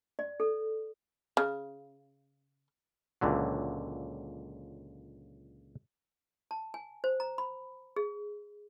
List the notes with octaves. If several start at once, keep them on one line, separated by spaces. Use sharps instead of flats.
D5
A4
C#3
C#2 A#2 D3 F#3
A5
G#5
C5
A#5
B5
G#4